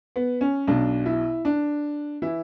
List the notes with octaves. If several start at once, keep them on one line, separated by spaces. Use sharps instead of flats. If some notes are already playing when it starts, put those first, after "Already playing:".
B3
C#4
B1 B2 D4
E4
D4
E3 E4